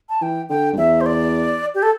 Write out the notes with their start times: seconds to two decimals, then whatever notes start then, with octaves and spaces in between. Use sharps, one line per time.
0.09 A5
0.21 E3 G5
0.50 D3 G5
0.73 G2
0.78 E2 E5
1.01 C5
1.06 D5
1.75 G4
1.83 A4